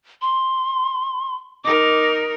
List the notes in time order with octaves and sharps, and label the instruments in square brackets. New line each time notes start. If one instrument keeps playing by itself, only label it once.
[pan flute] C6
[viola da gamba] D#4 A#4 [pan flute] D6